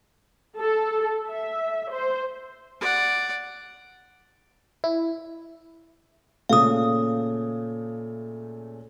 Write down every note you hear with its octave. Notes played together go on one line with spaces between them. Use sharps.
A4
E5
C5
D5 F#5
E4
A#2 C#3 A3 F5 D#6